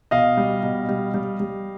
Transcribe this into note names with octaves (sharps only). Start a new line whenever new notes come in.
B2 D#5 F5
G3
B2
G3
G3
G3